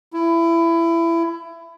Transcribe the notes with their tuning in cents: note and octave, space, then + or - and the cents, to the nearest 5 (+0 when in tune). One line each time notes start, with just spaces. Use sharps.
E4 +20